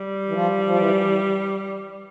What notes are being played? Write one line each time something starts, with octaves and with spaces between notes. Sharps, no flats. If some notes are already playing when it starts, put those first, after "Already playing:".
Already playing: G3
E3
F3
F3
E3